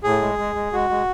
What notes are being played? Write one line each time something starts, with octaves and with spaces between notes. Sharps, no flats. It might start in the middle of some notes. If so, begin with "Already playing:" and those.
A2 G#4
G#3
G#3
G#3
G#3 F#4
G#3